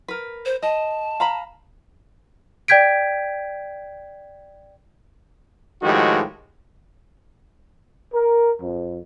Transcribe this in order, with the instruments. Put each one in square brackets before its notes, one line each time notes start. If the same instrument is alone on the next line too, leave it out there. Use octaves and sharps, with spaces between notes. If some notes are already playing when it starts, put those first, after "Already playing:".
[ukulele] A#4 B4
[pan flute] C5
[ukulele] D#5 [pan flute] A5
[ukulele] F5 A#5 B5
[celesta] D5 G5 G6 G#6 B6 D7
[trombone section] A2 D#3 F3 G#3 F#4 G4
A#4
F2